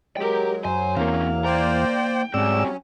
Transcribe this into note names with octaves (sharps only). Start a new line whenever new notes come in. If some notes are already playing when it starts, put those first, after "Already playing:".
F#3 G#3 G4 A#4 G5
F#2 C5 G#5
E2 A#3 C4 C#4 F5
A#3 C5 D5 G5 A#5
G#2 F#3 G3 C4 C#4 D5 E6